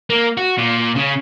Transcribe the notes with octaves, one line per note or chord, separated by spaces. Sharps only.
A#3
F#4
A#2
C#3